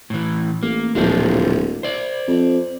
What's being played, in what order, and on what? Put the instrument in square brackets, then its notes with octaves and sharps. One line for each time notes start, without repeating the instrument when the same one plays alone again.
[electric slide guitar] A2 E3
[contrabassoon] A1 [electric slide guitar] A#3
[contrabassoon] D1 [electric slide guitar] A#2 F3 G#3
[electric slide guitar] C5 D5
[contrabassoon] F2